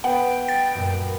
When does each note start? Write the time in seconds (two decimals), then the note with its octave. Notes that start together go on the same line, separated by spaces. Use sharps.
0.04 B3 F#5 G5
0.48 A6
0.75 F#2 A#2